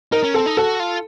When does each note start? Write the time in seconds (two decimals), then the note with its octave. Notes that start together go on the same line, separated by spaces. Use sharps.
0.12 D#4 A#4
0.23 C#4
0.34 C4 A4
0.46 D#4
0.57 F#4 A4
0.80 F4